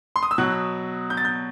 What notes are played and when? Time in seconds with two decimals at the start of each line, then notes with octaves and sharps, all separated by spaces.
0.16 C6
0.23 D#6
0.31 E6
0.38 B2 F#3 F#6
1.10 G6
1.17 A6
1.25 G6